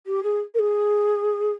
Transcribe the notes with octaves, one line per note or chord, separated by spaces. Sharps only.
G4
G#4
A#4
G#4